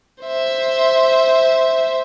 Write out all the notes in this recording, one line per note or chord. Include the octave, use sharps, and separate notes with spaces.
C5 E5